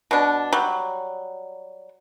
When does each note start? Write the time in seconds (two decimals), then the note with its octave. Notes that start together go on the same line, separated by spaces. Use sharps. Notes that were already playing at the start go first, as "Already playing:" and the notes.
0.11 B2 D4
0.53 F#3 G3